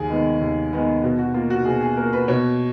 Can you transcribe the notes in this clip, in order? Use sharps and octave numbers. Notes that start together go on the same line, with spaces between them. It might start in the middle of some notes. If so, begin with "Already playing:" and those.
Already playing: D#2 G#4
D#3 G#3 B3
D#2
D#3 G#3 B3
B2
F#4
A#3 F4
F#4
B2 G#4
G#4
A#3 A#4
B4
B2 C#5